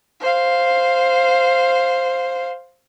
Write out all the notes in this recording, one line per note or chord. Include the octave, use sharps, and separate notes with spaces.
C5 F5